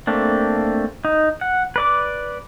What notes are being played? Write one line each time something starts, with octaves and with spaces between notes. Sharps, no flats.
A3 A#3 C4 D4
D#4
F#5
B4 D5 D6